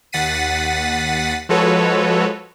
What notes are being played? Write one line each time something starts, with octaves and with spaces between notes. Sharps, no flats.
D#2 F#5 A6 B6 C7 D#7
F3 G#3 F#4 A4 B4 C#5